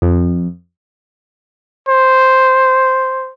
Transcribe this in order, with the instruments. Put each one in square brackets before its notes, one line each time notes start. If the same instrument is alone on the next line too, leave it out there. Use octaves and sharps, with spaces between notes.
[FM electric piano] F2
[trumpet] C5